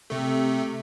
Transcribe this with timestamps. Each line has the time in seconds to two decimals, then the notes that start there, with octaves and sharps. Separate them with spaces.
0.10 C3 A3